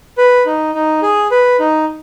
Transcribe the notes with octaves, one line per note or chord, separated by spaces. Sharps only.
B4
D#4
D#4
G#4
B4
D#4